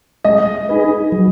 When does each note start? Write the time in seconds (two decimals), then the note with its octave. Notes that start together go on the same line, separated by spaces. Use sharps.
0.25 G#3 D#5
0.69 D#4 G#4 B4
1.12 F#3